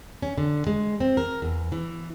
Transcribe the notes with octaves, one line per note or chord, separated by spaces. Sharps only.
C#4
D3
G#3
C4
A#4
E2
E3